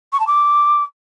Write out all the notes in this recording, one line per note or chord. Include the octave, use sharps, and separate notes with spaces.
C#6
A5
D6